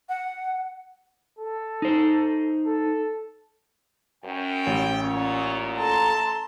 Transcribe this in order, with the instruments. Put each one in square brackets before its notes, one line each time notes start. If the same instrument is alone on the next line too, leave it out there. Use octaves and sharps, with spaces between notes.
[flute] F#5
[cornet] A4
[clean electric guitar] D#4 C5
[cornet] A4
[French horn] F#2 [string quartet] C#4 [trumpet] G5
[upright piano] A1
[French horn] A#2 [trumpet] C#5
[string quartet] A4 A#5 C6 [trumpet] A5